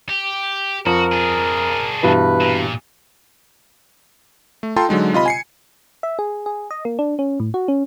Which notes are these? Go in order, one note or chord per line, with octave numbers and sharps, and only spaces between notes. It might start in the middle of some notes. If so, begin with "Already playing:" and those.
G4
F2 F#4 A#4
D4 G#4
G2 B2 E3 B4
A#2
A3
F4 A4 G5 A5 A#5 C6
D3 F#3 G#3 D#4
C3 F4 D#5 B5
G#5 C7 C#7
E5
G#4
G#4
D#5
A#3
D4
C#4
A2
F#4
C#4